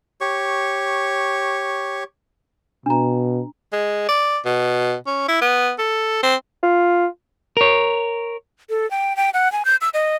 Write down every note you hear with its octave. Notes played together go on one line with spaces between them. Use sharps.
G4 C#5 C#6
B2 D4 A#5
G#3
D5
B2
C#4
E4
B3
A4
C4
F4
A#4 C#5
A4
G5
G5
F#5
G#5
G6
E6
D#5